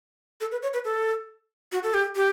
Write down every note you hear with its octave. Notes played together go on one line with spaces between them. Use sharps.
A4
B4
C#5
B4
A4
F#4
A4
G4
G4